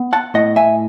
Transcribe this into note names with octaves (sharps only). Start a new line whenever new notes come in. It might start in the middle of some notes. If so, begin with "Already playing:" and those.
Already playing: B3
F#5 A5
A2 D#5 F#5
E5 G#5